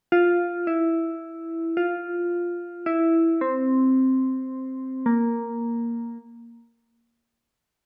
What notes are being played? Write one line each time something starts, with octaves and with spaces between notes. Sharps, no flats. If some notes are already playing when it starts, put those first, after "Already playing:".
F4
E4
F4
E4
C4
A#3